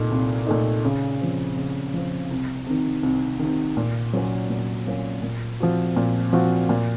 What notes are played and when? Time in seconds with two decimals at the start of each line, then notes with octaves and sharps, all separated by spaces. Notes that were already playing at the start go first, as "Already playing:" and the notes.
Already playing: C2 A#2 A3 D#4
0.11 C2
0.47 A#2 A3 D#4
0.84 C#3
1.20 F3 C4
1.57 C#3
1.94 F3 C4
2.30 C2
2.67 C3 D#3
3.03 C2
3.39 D#3
3.44 C3
3.77 A#2
4.13 F#3 A#3 C#4
4.50 A#2
4.87 F#3 A#3 C#4
5.23 A#2
5.60 F3 C4 F#4
5.96 A#2
6.33 F3 C4 F#4
6.69 A#2